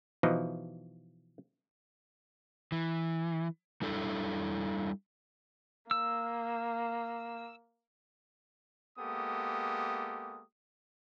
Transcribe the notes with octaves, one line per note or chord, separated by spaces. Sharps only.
B2 E3 F3 D#4
E3
G3 D4 E4 A4
A#3 E6
G#3 A#3 B3 G4 A4 D#6